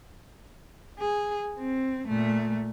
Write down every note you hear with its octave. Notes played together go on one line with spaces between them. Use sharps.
G#4
C4
A#2 A3